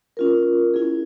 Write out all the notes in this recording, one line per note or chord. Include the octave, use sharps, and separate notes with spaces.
C#4 F4 A#4
C#4 E4 G#4